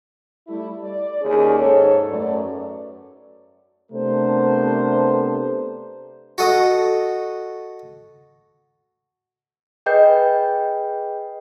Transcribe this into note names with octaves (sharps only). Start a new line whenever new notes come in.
G3 A3 E4
D5
D#2 C#4 G#4
G#2 A4 C#5
F#2 F#3 A3 B4 D5
C3 A3 B3 D4 A#4 C5
F#4 A4 D#5
G#4 B4 D#5 G5 G6 C7